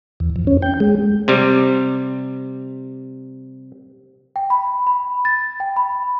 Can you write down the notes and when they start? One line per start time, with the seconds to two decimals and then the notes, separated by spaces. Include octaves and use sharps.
0.20 E2
0.36 F2
0.47 C#4
0.62 G5
0.80 G#3
1.28 C3 G3
4.36 G5
4.50 B5
4.87 B5
5.25 A6
5.60 G5
5.76 B5